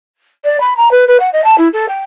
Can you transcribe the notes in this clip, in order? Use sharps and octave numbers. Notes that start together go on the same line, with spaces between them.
D5
B5
A#5
B4
B4
F#5
D#5
A5
E4
A4
G5